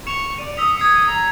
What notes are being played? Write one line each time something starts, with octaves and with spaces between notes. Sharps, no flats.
C#6 C#7 E7 F7
D5 D#7
D#6 E6 B6 F7
D#6 G#6 C7 C#7
A#5